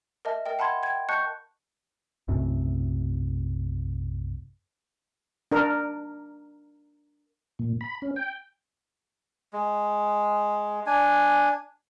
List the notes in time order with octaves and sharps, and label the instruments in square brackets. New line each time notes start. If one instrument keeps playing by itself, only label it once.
[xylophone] A#4 D#5 E5 A5
A#4 D#5 G5
F#5 A5 B5 C6 G#6
G5 G#6
D#5 A5 C#6 F#6 G6 C#7
[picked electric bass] B1 F#2 A2 C3
[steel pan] D4 A#4
[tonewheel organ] A#2
B5
C#4
G5
[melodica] G#3
D4 G#5